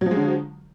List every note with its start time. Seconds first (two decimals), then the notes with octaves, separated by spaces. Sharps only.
0.01 F#3
0.06 F3
0.11 G#3
0.16 D3